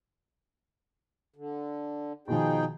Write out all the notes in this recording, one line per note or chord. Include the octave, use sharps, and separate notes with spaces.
D3
B2 D#3 F3 D#4 G#4 G5